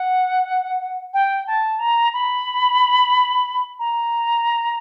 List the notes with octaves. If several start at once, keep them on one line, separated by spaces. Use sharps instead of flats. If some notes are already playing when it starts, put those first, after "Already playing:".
Already playing: F#5
G5
A5
A#5
B5
A#5